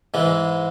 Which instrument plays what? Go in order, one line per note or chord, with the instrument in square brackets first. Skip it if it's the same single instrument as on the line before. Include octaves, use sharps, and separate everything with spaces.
[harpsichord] G#2 E3 G#3